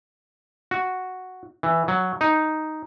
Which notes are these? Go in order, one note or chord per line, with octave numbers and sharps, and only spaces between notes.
F#4
E3
F#3
D#4